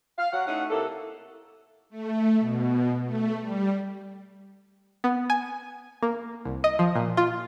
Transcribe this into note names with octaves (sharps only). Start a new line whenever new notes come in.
F5
F#3 F#5
A3 C#4 D#4 E4 F#5
C3 A#3 E4 A4
A3
B2
A3
G3
B3
G#5
A#3
C2
D#5
F3
A#2
F4